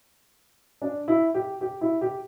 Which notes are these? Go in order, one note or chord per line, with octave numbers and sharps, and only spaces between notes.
D4
E4
G4
G4
E4
G4